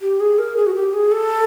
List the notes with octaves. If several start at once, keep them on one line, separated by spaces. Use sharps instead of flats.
G4
G#4
A#4
G#4
F#4
G4
G#4
A4